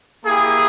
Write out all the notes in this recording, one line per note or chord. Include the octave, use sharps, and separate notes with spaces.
A#3 E4 G4 G#4